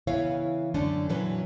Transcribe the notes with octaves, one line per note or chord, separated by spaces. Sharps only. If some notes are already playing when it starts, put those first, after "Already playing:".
C#3 E3 B3 E4 C#5 F5
F#2 D3 A3 C#4 D4
F2 A#2 E3 F#3 C#4 B4